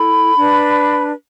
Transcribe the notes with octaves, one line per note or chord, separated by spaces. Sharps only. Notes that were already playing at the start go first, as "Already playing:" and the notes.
Already playing: E4 A4 B5
D4 B4